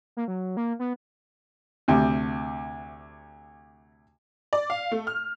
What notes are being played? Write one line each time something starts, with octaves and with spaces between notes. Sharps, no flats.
A#3
F#3
A#3
B3
D2 C3
D5
F5
A3
F6